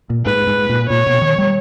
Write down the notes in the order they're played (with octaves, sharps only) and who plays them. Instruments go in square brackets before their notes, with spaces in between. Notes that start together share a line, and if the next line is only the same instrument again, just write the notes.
[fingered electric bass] A#2
[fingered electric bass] G#2 [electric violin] B4
[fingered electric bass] G#2
A#2
[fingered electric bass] A#2 [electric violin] C#5
[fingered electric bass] B2
D#3
G3